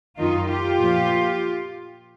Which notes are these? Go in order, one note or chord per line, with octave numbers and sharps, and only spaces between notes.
F#2 D#3 D#4 F4
F4 G4
A#2 F3